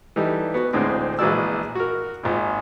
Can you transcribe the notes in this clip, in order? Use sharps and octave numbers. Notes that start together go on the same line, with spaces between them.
E3 G3 D#4 A4
B3 F#4
D2 A2 D3 G#3 C4
A#1 E3 G#3 F#4 D5 E6
F#4 A#4
G#1 A#2